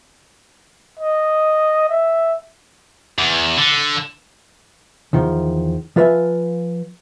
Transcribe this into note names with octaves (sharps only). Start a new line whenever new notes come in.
D#5
E5
E2
D3
E2 D#3 F3
F3 F4 B4 C#5 E5 G#5